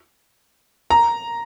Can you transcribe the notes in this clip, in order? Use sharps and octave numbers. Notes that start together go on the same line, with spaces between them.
A#5